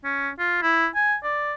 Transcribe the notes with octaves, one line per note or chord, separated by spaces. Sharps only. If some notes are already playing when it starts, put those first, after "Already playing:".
C#4
F4
E4
G#5
D5